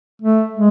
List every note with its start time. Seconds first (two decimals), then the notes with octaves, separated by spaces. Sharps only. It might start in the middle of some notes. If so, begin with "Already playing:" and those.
0.22 A3
0.53 G#3